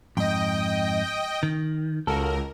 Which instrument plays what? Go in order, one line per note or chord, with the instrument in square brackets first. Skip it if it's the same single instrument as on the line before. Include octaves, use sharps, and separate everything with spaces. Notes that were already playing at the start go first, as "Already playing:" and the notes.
[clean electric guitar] F2 G#2 [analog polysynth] D#5 G5
[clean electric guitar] D#3
[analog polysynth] C#2 A#4 [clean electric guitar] F#4 A4